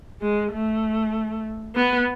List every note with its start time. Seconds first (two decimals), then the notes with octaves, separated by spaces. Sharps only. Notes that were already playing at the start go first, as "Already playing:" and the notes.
0.22 G#3
0.52 A3
1.76 B3